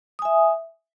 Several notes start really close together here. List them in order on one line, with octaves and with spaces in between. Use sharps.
D#6 G#5 E5